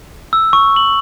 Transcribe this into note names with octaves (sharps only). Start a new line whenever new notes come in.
E6
C#6
F#7